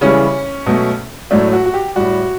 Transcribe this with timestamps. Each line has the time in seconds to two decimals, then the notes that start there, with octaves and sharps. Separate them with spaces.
0.01 C#3 E3 G3 C#4
0.66 B2 F#3 A3
1.31 A2 F#3 A3 D4
1.53 F#4
1.66 F#4
1.74 G4
1.96 A2 G3 F#4